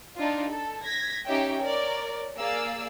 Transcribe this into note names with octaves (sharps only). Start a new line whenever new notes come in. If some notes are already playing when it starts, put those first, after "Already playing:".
D4 D#4 F4
A4
G#6 A#6 B6
C#4 D#4 G4 C#5 E5 G5
A#4 C#5 D5
A#3 G#4 D5 F5 E6